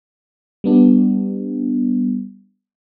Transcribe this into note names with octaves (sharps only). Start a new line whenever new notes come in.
G3 B3 D4